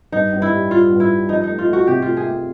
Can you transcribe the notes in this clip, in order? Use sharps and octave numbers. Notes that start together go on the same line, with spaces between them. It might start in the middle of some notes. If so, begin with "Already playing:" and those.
G2 D#4
G2
E4
G3
G3 F4
G2
E4
G3
F3 D#4
D#4
A3
F4
A3
F#4
C3 G4
A3 F4
G#4
A3